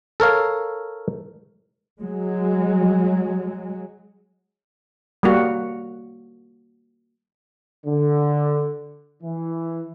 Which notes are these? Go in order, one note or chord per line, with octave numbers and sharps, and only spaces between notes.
A4 A#4 C#5 F5
F#3 G#3
G3 A#3 F#4
D3
E3